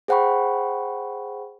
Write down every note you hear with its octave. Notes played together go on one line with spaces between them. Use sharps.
G#4 C5 F#5 G5 B5 C#6